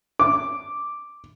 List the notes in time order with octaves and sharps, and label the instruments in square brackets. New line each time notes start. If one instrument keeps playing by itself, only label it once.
[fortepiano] D6